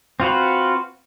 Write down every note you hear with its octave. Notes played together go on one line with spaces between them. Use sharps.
C4 F4 F#4 B4